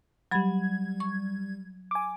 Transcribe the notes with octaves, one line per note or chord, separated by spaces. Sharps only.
F#3 G3 B5 G#6
C#6
G#5 D6